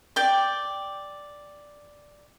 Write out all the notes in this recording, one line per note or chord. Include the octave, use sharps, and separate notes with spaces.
D5 G5